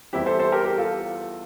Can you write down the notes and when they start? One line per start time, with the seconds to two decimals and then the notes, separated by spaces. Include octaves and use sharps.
0.13 E2 E3 G3 C4 E4 G4
0.26 A4 C5
0.39 A4 C5
0.52 G4 A#4
0.65 G4 A#4
0.78 F4 A4